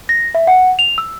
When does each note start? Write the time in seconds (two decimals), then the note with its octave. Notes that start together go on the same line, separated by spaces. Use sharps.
0.09 A#6
0.35 E5
0.47 F#5
0.79 F7
0.98 E6